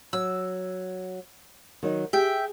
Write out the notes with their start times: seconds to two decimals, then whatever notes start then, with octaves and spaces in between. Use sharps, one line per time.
0.13 F#3 E6
1.83 D#3 F#3 D#4
2.13 G4 G#4 E5 G5